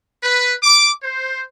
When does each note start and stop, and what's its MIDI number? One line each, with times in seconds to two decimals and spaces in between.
0.23 0.53 71
0.63 0.90 86
1.03 1.42 72